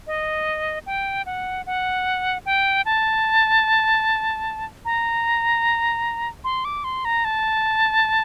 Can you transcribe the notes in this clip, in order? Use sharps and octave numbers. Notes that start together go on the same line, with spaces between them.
D#5
G5
F#5
F#5
G5
A5
A#5
C6
D6
C6
A#5
A5